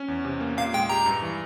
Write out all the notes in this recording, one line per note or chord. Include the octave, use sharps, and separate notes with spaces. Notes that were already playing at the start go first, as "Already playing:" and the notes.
Already playing: C#4
E2
C3
A#3
A#2 F5
G#3 G5
G4 A#5
G2
E3